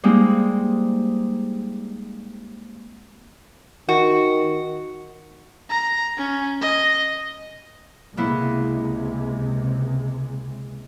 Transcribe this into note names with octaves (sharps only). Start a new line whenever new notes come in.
G3 G#3 A#3 C4 D#4
D#3 F#4
A#5
C#4
D#5
C#2 C3 G#3 A#3 B3 E4